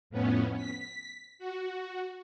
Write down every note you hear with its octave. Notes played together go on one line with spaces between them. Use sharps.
F2 A2 B3 C#4
B6
F#4